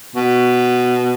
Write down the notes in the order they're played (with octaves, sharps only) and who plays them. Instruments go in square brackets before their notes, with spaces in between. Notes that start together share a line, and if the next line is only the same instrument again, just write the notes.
[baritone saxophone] B2